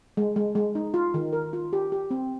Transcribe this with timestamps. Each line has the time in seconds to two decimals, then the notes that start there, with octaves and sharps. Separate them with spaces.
0.17 G#3
0.36 G#3
0.55 G#3
0.75 D#4
0.94 F4
1.14 D#3
1.33 A#4
1.53 F4
1.73 G4
1.92 G4
2.11 C4